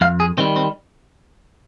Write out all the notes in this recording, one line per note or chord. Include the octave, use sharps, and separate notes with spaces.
F2 F5
G#4
D#3 G3 C4
C4